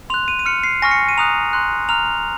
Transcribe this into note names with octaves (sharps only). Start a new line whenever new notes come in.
C6 F#6 F7
D#7
D#7
C6 F6 C#7
C7
G#5 C#6 F6 A#6
C#7
D#7
A#5 D#6 F#6 F7
C6 F#6
A#5 F6 F7